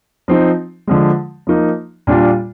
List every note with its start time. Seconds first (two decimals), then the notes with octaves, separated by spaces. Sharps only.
0.28 F3 C4 D#4
0.87 D3 F3 G#3
1.47 F3 A#3 D#4
2.07 A#2 G3 D4 F4